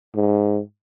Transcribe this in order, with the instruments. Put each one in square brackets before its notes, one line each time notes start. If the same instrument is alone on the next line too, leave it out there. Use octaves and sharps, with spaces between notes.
[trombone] G#2